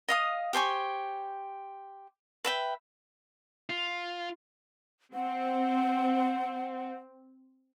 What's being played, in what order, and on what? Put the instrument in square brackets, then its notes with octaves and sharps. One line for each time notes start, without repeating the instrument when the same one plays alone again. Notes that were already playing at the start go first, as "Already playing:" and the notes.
[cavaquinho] D#5 F5 D#6
G4 C5 G#5 C#6
B4 E5 G5
[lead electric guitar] F4
[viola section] C4 [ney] F#5